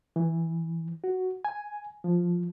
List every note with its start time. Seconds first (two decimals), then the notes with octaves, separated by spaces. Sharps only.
0.16 E3
1.04 F#4
1.45 G#5
2.04 F3